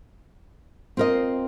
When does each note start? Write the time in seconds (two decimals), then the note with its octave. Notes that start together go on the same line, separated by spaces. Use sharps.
0.97 C4 F4 A#4 D#5